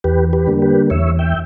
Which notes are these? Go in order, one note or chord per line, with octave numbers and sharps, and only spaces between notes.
E2 G4 B4
G4 B4
D3 G3 A#3
G4 B4
E2 C#5 E5
E5 G5